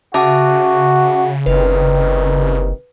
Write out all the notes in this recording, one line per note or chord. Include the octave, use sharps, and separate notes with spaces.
C#3 F#4 E5 A5 D6
F#1 C2 C3 D#3 B4